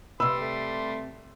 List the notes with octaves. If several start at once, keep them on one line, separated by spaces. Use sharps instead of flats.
C3 G3 B4 C6 E6
A3